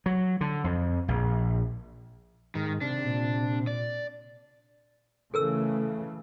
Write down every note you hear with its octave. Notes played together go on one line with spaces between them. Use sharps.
F#3
D3
F2
A#1
G#2 D#3
C3 D4
A#2
D5
C#3 E3 A3 A4 A#4 E6